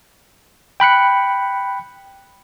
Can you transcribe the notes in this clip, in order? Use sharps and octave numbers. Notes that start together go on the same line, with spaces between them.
G5 B5 F#6 C#7